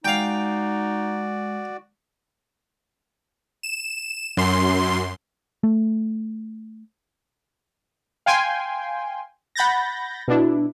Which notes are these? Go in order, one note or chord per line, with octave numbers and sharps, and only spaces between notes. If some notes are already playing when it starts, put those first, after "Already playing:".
G#3 D#4 F#4 D5 F5 G5
E7
F#2 C6
A3
F5 G5 G#5 C6
F#5 B5 G6 A6 A#6
B2 D4 E4